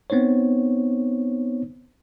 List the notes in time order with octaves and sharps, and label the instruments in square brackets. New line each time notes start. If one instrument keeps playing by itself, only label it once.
[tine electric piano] B3 C4 D#4 C5 C#5